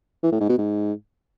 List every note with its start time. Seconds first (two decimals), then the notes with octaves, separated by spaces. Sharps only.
0.23 E3
0.32 A2
0.40 G#2
0.49 B2
0.58 G#2